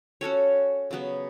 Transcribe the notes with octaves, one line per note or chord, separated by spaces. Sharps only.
C#4 F#4 A4 C#5
C#3 F#3 B3